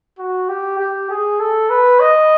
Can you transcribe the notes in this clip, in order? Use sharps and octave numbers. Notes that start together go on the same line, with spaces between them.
F#4
G4
G4
G#4
A4
B4
D#5